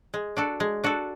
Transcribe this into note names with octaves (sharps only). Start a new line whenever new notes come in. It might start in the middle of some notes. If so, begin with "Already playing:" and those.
G#3
D4 F#4 A4
G#3
D4 F#4 A4